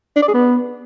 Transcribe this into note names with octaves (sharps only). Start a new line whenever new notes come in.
D4
D5
G#4
B3